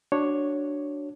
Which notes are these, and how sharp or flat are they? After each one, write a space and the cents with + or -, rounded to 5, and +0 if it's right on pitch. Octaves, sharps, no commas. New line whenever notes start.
D4 +0 F#4 +10 C#5 +0